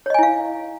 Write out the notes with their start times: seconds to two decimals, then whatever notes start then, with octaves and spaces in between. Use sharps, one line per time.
0.06 C#5
0.10 D#5
0.14 G#5
0.19 E4
0.23 F5